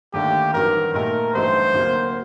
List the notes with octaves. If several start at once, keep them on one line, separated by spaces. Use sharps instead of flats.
D#2 D3 A3 D4 G4
A1 G2 D#3 F#3 A#4
A#2 A3 D#4 G4 A#4
A1 G2 F#3 A3 D#4 C5
D2 C3 F#3 A#3